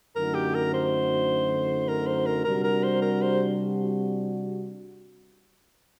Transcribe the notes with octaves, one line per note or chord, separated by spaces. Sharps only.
F#2 D3 A3 D#4 F#4 A#4
G4
A#4
C5
A#4
C5
A#4
C3 G3 D4 F#4 A#4
A#4
C5
A#4
C5